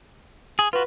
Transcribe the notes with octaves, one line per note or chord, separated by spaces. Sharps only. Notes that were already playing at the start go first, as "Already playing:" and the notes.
G#4
F4 F#4 B4